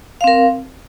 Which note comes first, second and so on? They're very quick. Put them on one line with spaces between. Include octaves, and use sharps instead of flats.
F5 C4 A#4